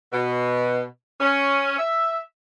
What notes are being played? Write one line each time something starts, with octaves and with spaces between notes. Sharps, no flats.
B2
C#4
E5